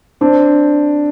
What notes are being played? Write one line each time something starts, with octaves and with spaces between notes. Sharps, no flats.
C4 D4